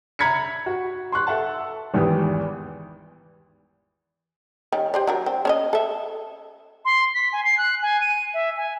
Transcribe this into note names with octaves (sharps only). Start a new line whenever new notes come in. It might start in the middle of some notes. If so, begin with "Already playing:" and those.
E5 A#5 B5 G#6 B6 C#7
F#4
C6 C#6 F#6
A4 E5 F#5 A5
G#1 E2 E3 G4 B4 D#6
D#3 G3 C#4
G4 C5 D5
F#3 D4 A#4
C4
C#4 C#5 D#5
A4 E5
C6
B6
G#5
C7
F#6
G#5
D#7
E5
G#5